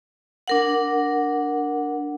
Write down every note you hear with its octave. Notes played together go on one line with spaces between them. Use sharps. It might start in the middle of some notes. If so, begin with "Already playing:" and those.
D4 A#4 F#5